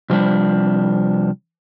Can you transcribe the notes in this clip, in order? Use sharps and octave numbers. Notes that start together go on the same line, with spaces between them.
C3 F3 G3 D4